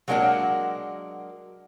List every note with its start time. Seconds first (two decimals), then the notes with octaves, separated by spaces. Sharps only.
0.08 F#3 G#3 A#3 D4 A#4 F#5